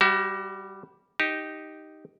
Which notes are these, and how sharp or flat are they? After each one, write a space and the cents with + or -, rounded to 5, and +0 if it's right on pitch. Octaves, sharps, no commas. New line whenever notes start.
G3 +0 F#4 +30 E5 +35
D#4 +0 G4 -5